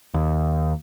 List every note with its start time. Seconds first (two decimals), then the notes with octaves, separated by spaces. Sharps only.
0.14 D#2